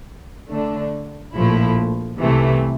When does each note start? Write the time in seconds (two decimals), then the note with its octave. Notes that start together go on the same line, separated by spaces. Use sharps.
0.50 D3 A3 D4
1.35 A#1 A2 F3 A3 E4
2.20 C2 C3 E3 A3